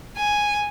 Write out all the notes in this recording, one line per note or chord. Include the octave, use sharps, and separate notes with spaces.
G#5